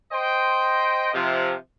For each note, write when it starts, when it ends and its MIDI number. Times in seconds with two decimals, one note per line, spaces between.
0.11 1.11 72
0.11 1.11 75
0.11 1.11 79
1.14 1.54 48
1.14 1.54 53